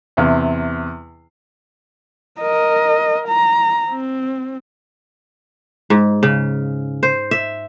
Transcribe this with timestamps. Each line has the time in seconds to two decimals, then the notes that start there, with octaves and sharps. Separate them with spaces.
0.17 E2 C3
2.41 A#4 D#5
3.28 A#5
3.90 C4
5.90 G#2
6.23 C#3
7.03 C5
7.31 E5